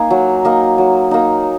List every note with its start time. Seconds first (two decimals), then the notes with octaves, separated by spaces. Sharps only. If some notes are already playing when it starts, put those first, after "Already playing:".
Already playing: A#3 D#4 G#5
0.10 F#3
0.45 A#3 D#4
0.78 F#3
1.11 A#3 D#4